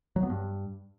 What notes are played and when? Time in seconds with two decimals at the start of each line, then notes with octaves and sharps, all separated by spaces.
0.16 F#3
0.23 B3
0.30 G2